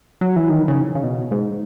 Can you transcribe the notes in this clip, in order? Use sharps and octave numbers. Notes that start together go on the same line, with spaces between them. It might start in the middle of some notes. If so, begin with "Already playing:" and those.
F#3
E3
D#3
C#3
C#3
B2
G#2